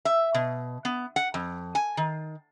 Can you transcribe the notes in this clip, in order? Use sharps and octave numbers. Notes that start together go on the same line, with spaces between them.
E5
B2
B3
F#5
F2
G#5
D#3